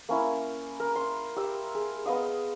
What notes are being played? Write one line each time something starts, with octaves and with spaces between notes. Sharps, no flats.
A#3 C#4 E4
A#4
C6
G4 E6
G#4
B3 D#5 F5 D#6